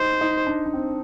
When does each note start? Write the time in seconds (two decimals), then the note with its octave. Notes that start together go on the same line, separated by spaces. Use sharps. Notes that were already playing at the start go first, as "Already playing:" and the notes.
Already playing: D#4 C5
0.21 D#4
0.47 D4
0.66 D4
0.74 C4